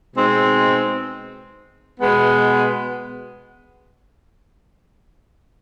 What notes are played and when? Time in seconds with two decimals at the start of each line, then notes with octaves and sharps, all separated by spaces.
0.14 B2 G#3 C4 D#4
2.00 B2 G#3 B3